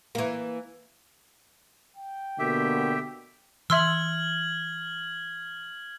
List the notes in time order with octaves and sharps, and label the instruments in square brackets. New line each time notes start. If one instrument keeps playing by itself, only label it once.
[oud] E3 A#3
[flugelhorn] G5
[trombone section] B2 D3 A#3 [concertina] G4 E5
[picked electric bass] E3 [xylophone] E5 C6 E6 [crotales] F6 G#6 F#7